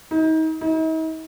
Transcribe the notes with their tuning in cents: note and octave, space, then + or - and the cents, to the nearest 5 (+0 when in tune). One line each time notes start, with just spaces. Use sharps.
D#4 +35
D#4 +45